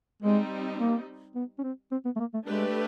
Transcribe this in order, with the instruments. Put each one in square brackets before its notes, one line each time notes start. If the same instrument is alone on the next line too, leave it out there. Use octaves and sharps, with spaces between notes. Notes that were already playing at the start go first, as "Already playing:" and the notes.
[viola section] G3 C4 D#4 [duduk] G#3
[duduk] A#3
B3
C#4
C4
C4
B3
A3
A#3
A3
[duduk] G#3 [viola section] A3 D4 G4 B4